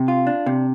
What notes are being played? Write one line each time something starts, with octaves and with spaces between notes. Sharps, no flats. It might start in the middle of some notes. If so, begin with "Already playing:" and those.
Already playing: C3
F4
D4
C3